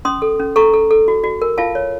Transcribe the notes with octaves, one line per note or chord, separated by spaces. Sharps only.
C#4 C6 D#6
A4
C#4
A4 A#5 C#6
A4
A4
F#4
F#4
A#4
F4 F5 A5
C#5